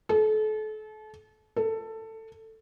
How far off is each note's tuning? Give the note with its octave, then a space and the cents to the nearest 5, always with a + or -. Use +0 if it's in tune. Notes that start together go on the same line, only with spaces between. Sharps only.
A4 -35
A4 +15